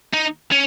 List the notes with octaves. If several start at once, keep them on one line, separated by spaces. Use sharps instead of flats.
D#4
C#4